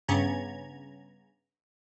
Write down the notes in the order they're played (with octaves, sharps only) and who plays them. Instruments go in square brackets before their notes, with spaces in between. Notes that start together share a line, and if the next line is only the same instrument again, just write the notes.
[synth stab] G2 C#3 B3 C#4 A#5 G#6